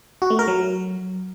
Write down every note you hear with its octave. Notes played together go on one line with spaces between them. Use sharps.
F#4
A3
A#4
F#3